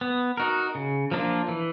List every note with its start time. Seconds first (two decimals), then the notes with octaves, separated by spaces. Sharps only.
0.01 B3
0.37 D#4 F#4 A#4
0.75 C#3
1.11 F3 A#3 D4 F4
1.48 E3